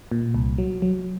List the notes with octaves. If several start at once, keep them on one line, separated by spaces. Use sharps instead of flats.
A#2
C2
F#3
F#3